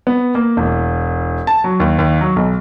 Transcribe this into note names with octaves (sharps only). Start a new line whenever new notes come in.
B3
A#3
E1
A5
F#3
D#2
D#2
F#3
B1